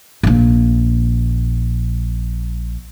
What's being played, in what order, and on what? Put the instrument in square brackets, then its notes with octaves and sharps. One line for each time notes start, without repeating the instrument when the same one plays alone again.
[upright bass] A#1 A#2